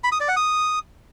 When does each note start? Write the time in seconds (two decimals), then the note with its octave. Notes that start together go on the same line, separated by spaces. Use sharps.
0.04 B5
0.12 D#6
0.20 D5
0.28 F#5
0.36 D#6